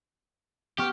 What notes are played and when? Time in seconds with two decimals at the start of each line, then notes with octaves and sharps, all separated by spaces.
0.78 B3 G4 C#6 F6